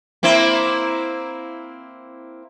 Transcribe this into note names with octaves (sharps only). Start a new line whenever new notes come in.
A#3 C4 E4